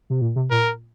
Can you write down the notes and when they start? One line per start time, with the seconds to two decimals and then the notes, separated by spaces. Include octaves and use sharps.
0.10 C3
0.21 A#2
0.36 C3
0.50 A#2 A#4